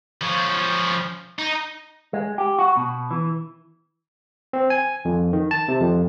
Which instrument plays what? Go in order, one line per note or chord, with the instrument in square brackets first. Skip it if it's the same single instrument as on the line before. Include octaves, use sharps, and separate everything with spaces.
[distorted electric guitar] F3 C#4
D#4
[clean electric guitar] G#3
G4
F#4
B2
E3
[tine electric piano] C4
G#5
F2
D#3
A5
C3
F2